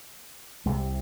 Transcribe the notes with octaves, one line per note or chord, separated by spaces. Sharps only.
C2 C3 G#3